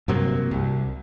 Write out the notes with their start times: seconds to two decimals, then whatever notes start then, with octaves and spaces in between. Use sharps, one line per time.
0.08 G2 C3 F#3 A#3
0.51 C2